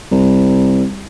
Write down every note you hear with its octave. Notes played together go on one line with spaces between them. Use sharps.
C2